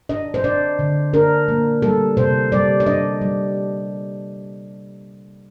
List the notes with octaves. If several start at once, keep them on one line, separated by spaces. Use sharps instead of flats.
D4 D#5
C5
D4 D5
D3
D4 A#4
A#3
G3 A4
C3 C5
G3 D5
D5
D4 D#5
G3